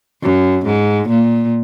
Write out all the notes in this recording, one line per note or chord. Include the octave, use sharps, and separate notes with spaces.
F#2
G#2
A#2